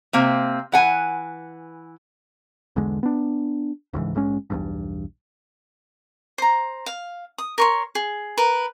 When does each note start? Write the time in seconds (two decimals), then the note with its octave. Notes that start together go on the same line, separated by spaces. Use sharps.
0.13 C3 A#3 C4
0.72 E3 F#5 G#5
2.76 B1 E2 D3 G#3
3.03 B3 D4
3.93 D1 C#2 G#2 E3
4.15 A#1 G#2 G#3 C#4
4.50 B1 E2 G2
6.38 C5 A#5
6.86 F5
7.38 D#6
7.58 A#4 C#5 C6
7.95 G#4
8.37 A#4 B4